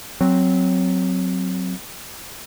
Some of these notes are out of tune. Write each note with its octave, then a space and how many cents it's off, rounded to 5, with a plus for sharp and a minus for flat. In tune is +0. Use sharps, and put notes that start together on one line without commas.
F#3 +0 C4 +0